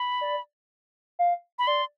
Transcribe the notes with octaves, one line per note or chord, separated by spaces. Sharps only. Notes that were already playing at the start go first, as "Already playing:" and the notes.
Already playing: B5
D5
F5
B5
D5 C6